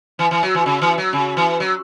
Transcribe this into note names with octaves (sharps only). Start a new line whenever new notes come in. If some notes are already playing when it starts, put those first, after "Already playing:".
E3
E3
F#3
E3
C#3
E3
F#3
C#3
E3
F#3